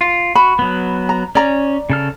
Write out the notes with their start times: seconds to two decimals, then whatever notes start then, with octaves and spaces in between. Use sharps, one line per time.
0.01 F4
0.35 F#4 B5
0.59 F#3 B3
1.09 A#5
1.35 C#4 D5 A#5
1.90 C#3 A4 F6